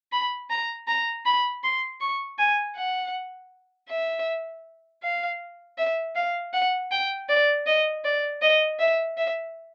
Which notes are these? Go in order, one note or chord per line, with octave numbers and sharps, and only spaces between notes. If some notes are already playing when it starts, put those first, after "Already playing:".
B5
A#5
A#5
B5
C6
C#6
G#5
F#5
E5
F5
E5
F5
F#5
G5
D5
D#5
D5
D#5
E5
E5